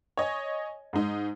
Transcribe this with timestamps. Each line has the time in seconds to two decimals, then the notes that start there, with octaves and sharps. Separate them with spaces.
0.17 C#5 D#5 G#5
0.93 G#2 G#3 D#4